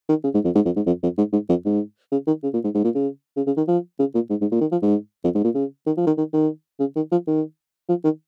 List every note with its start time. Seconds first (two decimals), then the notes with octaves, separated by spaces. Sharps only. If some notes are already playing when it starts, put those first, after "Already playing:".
0.09 D#3
0.24 C#3
0.34 G#2
0.45 F2
0.55 G#2
0.65 F2
0.76 G#2
0.86 F2
1.03 F2
1.18 G#2
1.33 G#2
1.50 F2
1.66 G#2
2.12 C#3
2.27 D#3
2.44 C#3
2.54 A#2
2.64 G#2
2.75 G#2
2.85 A#2
2.95 C#3
3.37 C#3
3.47 C#3
3.57 D#3
3.68 F3
3.99 C#3
4.15 A#2
4.30 G#2
4.41 G#2
4.52 A#2
4.61 D#3
4.72 F3
4.83 G#2
5.24 F2
5.35 G#2
5.44 A#2
5.55 C#3
5.87 D#3
5.97 F3
6.07 D#3
6.18 D#3
6.34 D#3
6.80 C#3
6.96 D#3
7.12 F3
7.27 D#3
7.89 F3
8.04 D#3